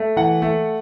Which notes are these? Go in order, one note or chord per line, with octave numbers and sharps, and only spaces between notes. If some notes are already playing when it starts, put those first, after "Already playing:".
Already playing: A3
E3 F#5
A3